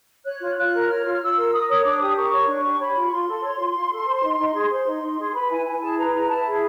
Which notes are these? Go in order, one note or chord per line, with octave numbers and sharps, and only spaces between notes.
C#5 F#6
F4
F4 F#6
A#4
C#5 F6
F4
F6
F4 E6
A#4
A#4 D#6
C#5 D#6
D4 D6
G4 D#6
A#4 C#6
C#5
D4 C#6
G4
C#5 B5
F4
C#6
F4 C6
A4
C#5
F4
F4
A4
C5
D#4
D#4
G#4
C5 C6
D#4
D#4
G#4
B4 B5
E4 G#5
E4 G#5
G#4 A5
B4 A#5
E4 A#5
E4 A5
G#4